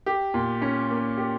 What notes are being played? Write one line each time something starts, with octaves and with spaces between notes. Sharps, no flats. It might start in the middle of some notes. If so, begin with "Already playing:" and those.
G4
A#2
C#4
A#3
G4